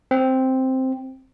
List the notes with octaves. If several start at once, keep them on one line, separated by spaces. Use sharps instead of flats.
C4